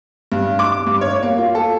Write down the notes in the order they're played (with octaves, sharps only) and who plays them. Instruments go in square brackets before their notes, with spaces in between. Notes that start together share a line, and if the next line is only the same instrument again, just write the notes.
[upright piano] G2
D6
G2
C#5
A#3
F4
A4